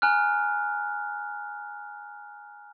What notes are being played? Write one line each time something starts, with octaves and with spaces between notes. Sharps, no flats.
G#5 A#5 F6 F#6